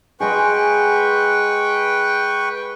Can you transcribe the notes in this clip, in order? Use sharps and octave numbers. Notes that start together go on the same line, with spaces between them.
G#3 F#4 G#4 B4 G5 C#6